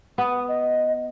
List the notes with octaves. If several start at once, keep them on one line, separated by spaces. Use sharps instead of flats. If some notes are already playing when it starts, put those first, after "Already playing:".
B3 D#6
D#5